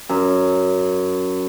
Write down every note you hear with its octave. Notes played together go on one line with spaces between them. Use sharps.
F#2